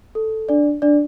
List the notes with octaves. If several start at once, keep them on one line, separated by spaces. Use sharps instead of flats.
A4
D4 D5
D4 D5